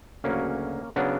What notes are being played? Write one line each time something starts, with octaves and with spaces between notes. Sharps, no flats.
D2 C#3 F#3 A#3 C#4
C#3 F#3 B3 D4